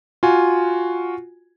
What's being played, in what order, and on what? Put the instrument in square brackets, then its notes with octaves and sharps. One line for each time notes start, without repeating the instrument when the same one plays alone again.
[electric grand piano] F4 F#4 G#5